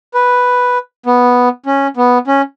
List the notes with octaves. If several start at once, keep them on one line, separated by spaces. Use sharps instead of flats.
B4
B3
C#4
B3
C#4